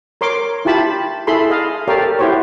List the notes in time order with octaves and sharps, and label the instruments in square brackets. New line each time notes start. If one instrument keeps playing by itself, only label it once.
[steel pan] A#4 C#5 C6 D6
E4 F4 G4 A5 B5
E4 G#4 A4 B5 C6
D#5 F5
G4 A4 A#4 C#5 D5 F5
E4 F#4 G4 C5 C#5